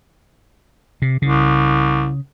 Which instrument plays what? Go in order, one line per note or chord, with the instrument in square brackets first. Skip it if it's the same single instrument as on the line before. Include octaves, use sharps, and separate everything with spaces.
[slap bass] C3
[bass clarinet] C2 [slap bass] C#3